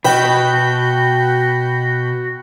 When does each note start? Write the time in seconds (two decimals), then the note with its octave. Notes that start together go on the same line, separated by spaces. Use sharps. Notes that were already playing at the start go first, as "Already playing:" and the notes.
0.04 B2 F#4 D#5 G5 B5 E6 G6